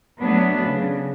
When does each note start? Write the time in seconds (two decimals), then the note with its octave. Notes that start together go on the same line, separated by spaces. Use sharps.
0.21 F#3 A3 B3 D4
0.63 C#3